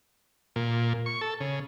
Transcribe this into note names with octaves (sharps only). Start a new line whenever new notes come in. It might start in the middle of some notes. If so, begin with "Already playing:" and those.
A#2
C#6
A4
C#3